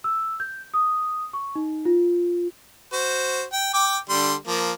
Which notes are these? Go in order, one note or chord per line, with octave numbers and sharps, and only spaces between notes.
E6
G6
D#6
C#6
D#4
F4
F#4 C5
G5
G5 D6
D3 G3 C6
F3 A#3